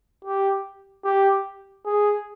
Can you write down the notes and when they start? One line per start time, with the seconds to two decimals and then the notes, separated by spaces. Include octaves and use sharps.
0.24 G4
1.04 G4
1.86 G#4